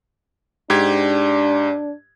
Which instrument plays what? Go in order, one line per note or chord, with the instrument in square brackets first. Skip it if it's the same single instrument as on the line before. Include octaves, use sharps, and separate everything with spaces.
[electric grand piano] G#2 G4 G#6 [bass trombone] D4